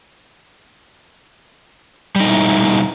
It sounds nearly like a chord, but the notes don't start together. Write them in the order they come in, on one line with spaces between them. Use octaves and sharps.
G3 D#4 B2 E4